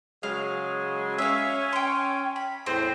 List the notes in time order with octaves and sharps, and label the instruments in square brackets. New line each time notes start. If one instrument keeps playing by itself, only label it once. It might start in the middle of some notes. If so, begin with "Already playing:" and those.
[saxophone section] C#3 F#3 G#3 [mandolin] F5
[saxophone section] C#4 [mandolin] E5 F5
[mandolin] G5 C6
B5
[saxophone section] E2 A2 C5 [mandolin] C4